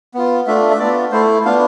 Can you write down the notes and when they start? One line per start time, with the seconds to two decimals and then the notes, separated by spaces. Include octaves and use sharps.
0.14 B3 F4
0.47 A3 D4 F4 E5
0.70 E5
0.79 B3 F4 D5
1.12 A3 E4 C5
1.45 B3 D4 F4 F5